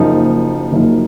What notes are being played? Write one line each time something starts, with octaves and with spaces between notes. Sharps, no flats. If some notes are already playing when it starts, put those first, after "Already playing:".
Already playing: F#1 F#2 F3 A#3 D#4
F#1 F#2 F3 A#3 D#4